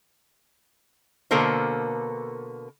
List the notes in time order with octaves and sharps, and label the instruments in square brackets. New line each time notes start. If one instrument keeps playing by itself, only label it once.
[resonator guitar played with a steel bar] B2 D3 A#3 A4 A#4 C5